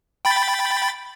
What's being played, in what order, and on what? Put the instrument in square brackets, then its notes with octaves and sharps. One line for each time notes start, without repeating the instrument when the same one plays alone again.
[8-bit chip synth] G5 B5 A6